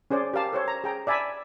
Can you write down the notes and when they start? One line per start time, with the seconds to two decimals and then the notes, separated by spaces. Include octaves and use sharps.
0.10 C#4 G#4 C5 D5
0.33 G4 A#4 F5 A5
0.53 A4 C5 C#5
0.68 A#5
0.84 G#4 G5 A#5
1.07 D5 E5 G#5 A5 B5